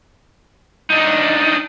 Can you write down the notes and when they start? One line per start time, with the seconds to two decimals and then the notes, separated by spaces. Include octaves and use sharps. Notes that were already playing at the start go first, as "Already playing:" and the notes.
0.90 D4 D#4